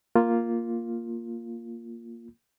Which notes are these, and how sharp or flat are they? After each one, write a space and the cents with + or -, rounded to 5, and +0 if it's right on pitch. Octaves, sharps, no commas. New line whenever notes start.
A#3 +0 F4 +0